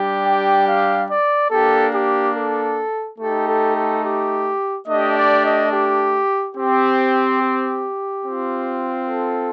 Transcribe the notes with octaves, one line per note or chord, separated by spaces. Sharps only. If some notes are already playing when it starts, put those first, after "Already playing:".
Already playing: G3 D4 G4
G5
F5
D5
A#3 D4 G4 A4
G4
A4
A3 D#4 G4 A4
A4
A4
G4
A3 D4 G4 D#5
D5
D#5
G4
C4 G4
G4
C4 F4
A4